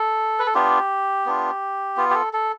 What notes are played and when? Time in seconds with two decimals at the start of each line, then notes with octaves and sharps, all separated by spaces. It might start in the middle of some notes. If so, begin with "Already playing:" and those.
Already playing: A4
0.39 B4
0.46 A4
0.54 B3 D4 F4 G4
1.26 B3 D4 F4
1.97 B3 F4
2.10 G4
2.15 A4
2.33 A4